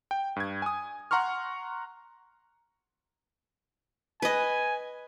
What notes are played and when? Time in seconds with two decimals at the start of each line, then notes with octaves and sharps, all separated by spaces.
0.11 G5
0.36 G2 G#6
0.62 G#5 D#6
1.11 F#5 A#5 C6 C#6 F6
4.22 B4 D#5 G#5